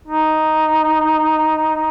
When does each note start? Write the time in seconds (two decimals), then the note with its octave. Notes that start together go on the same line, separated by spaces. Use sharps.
0.08 D#4